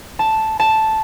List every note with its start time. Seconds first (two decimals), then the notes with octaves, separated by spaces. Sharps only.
0.19 A5
0.60 A5